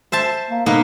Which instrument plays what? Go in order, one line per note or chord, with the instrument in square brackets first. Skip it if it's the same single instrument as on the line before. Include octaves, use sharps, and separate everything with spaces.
[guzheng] C5 E5 A5
[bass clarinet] A#3
[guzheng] B2 A#3 B3 [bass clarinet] D#4